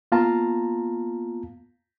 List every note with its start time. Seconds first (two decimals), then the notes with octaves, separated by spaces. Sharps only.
0.12 A#3 B3 F4 F5 A5 A#5